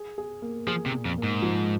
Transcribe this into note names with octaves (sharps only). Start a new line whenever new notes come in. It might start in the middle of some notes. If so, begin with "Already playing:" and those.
Already playing: G#4
G#4
A#3
F3 G#4
C3
A#2
F2
A#3
G#2
F3